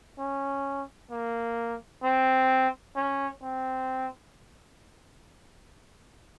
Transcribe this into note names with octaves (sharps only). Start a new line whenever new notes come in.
C#4
A#3
C4
C#4
C4